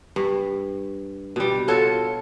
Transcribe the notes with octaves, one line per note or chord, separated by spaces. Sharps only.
G2
B2 G3
F4 F#4 A4 C#5